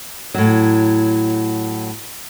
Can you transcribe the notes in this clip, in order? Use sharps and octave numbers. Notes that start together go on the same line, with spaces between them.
A2 F#3